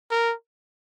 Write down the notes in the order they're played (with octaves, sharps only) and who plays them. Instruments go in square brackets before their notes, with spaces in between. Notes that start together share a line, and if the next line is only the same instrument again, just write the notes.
[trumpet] A#4